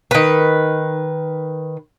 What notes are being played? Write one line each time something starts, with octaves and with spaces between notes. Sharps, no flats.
D#3 B4